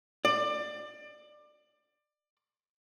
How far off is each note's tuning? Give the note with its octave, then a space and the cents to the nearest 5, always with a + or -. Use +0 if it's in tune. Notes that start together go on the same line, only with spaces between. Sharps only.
D5 +25